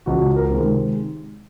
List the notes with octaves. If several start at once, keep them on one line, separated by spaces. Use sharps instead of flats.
C#2 F#4
A#4
C3 D#3 G#3